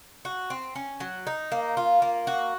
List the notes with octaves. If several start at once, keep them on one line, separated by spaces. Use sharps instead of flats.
F#4
C4
C#4
F#3
D#4
A#3
F4
A#3
F#4